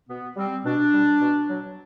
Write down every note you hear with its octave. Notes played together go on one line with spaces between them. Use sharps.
B2 B3
G3 C4
B2 D4
G3
B2
F#3